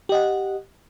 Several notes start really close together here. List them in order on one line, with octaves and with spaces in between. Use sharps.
G4 D#5 F#5